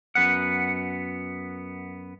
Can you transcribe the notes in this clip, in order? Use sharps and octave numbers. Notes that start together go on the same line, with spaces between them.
F#2 B3 F#5